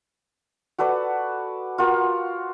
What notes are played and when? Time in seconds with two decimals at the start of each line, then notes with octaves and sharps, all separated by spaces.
0.78 F#4 A4 B4 D5
1.78 F4 F#4 A#4